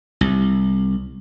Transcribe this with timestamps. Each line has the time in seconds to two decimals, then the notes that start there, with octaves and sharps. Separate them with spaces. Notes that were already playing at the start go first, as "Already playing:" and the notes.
0.21 C2